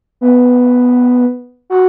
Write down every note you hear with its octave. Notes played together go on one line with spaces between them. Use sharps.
B3
F#4